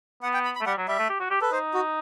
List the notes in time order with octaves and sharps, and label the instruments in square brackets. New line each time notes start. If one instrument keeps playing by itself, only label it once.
[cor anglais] B3 [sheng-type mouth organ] F#5
[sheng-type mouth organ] G5
B5
B5
[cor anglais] A3
[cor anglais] G3 [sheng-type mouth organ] F#5
[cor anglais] F#3
[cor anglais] G3 [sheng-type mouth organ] E5
[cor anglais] A3
G4
F#4
G4
[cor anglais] A4 [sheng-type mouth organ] B4
[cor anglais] D#4 [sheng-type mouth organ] C5
[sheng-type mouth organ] F#4